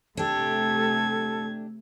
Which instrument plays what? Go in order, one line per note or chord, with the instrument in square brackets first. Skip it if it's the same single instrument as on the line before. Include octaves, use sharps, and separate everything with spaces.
[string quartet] C3 G#6 [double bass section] A3 [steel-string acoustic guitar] D4 G4 [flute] A4